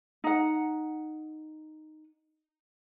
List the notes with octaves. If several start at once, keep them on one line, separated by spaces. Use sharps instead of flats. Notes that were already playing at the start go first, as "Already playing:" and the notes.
D#4 F#5